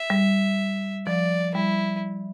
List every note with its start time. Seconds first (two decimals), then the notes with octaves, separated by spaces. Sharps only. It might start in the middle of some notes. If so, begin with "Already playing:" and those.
Already playing: E5
0.10 G3
1.06 F3 D5
1.55 G3 E4